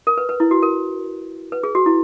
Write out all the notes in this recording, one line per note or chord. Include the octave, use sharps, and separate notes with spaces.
A#4
B4
B4
E4
F#4
A#4
B4
G#4
F#4
E4